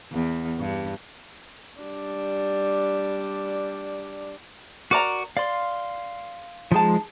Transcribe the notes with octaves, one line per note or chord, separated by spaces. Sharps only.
E2
G2
G3 D4
F#4 A#4 D5 A#5 D6
D5 F5 C6
F3 G#3 D#4 G#4 A5